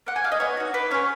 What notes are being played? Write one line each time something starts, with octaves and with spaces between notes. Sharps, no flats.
A#3 F#5
G#5
D#4 G#4 F5
D#5
B3 C#5
D#4 F#4
A#3 B4
C#4 G#4 C#5